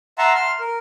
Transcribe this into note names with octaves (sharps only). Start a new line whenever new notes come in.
E5 F#5 A5 A#5 C6
C6 F6
A#4